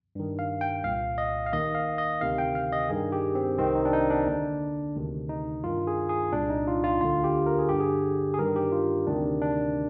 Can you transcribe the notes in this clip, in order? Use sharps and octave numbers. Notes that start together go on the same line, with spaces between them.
G2 D#3
F5
G5
C2 A#2 F5
D#5
F5
D#2 D#3 D#5
F5
D#5
D2 C3 D#3 F5
G5
F5
D#5
G2 D#3 G#4
G4
C4
C2 C3 D#3 C4
D#4
D4
D#4
D4
D#2 D3
D2 C3 D#3
D#4
G2 D#3 F4
G#4
G#4
C2 A#2 D4
D#4
F4
F4
D2 D3 F4
G4
A#4
G#4
G2 D3 G4
G#4
G#4
G2 D#3 A#4
G4
F4
D2 C3 D#3 D4
D4